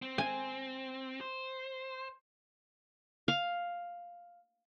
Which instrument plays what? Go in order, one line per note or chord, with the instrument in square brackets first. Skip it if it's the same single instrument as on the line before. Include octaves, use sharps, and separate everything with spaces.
[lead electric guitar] C4
[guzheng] G#5
[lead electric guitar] C5
[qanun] F5